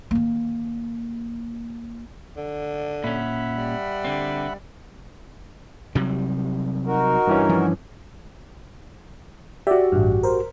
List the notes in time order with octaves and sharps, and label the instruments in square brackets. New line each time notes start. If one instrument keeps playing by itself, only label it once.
[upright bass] D#3 A#3
[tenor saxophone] D3
[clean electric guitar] A#2 C#4 [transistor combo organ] E5 F#5 B5
[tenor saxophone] G3
[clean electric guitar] D3 C4
[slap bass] C3 F#3 G3
[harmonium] D#4 F#4 A#4
[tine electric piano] G2 E3 C#4
[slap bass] F3
[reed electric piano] F#4 G4 [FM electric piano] D5 E5
[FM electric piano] A1 G2
A#4 C5